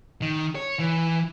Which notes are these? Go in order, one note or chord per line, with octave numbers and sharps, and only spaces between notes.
D#3
C#5
E3